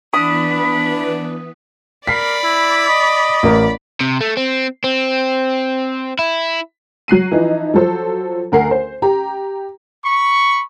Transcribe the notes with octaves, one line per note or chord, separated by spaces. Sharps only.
E3 B3 D4 B4 B5 D#6
A#4 D5 B5 B6 C7
E4
D#5
A1 A#4
C3
A3
C4
C4
E4
F#3 F#6 C7 D#7
E3 F3 D#4 E4
F3 F#3 A4 C5
D2 A#4 F#5 C7
C5
G4 A#5
B5 C#6